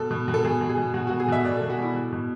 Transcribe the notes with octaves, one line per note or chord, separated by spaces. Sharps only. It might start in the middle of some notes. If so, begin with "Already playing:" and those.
Already playing: B2 A4
B2
B2
A4
B2 G#4
B2
G#4
B2
B2 F#4
F#4
B2
G#4
B2 E5
B2 D5
A4
B2
F#4
B2 E4
B2
B2